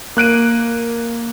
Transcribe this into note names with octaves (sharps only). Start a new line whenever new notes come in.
A#3 F#6 D7 D#7